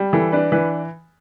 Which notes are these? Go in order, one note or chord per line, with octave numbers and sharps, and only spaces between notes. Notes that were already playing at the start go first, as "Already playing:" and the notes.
Already playing: G3
E3 A4
D4 B4
E3 B4